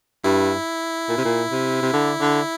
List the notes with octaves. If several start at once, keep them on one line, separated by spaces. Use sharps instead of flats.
G2 E4
A#2
C3
A#2
C3
C3
D3
D3